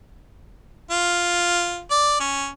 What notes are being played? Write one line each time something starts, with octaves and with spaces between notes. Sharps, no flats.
F4
D5
C#4